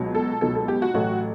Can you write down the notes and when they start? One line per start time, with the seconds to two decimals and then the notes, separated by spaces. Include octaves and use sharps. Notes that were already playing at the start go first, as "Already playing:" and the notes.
Already playing: C#2 B2 F#3
0.15 A4
0.41 C#2 B2 F#3 A4
0.55 A4
0.68 G4
0.82 F#4
0.94 A1 A2 F#3 A3 F#4